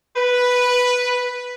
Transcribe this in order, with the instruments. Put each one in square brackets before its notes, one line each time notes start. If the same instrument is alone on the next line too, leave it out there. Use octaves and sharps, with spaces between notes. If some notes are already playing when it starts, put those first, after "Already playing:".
[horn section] B4